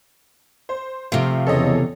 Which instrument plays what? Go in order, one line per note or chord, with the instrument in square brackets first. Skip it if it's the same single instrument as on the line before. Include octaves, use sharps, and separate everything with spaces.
[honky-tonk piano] C5
[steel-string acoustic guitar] C3 F3 [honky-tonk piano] A3 F4 D7
[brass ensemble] E2 C#3 [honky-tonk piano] A4 C#5 D#5